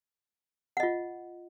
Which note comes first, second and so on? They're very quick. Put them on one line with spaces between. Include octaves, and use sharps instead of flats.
F#5 D#5 F4